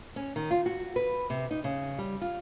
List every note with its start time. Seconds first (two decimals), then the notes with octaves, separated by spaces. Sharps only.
0.16 C#4
0.36 D#3
0.51 F4
0.66 F#4
0.96 B4
1.30 C3
1.51 D#4
1.64 C#3
1.98 G3
2.21 F4